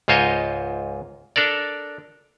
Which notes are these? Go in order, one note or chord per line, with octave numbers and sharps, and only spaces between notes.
C#2 G#2 F4 C5 C#5 D#5
D4 A4 A#4 D5